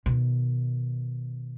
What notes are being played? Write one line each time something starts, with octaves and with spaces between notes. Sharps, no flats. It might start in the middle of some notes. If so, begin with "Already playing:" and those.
B2 D#3